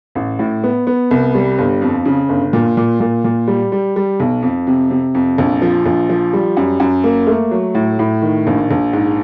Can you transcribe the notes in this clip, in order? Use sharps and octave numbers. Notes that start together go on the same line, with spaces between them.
A1
A2
B3
B3
C2
G3
G1
F2
C#3
G1
A#2
A#2
A#2
A#2
G3
G3
G3
B1
F2
C3
C3
F2
A#1
F3
A#1
F3
G3
F#2
F#2
A#3
A3
F#3
A2
A2
D#3
A#1
A#1
G#2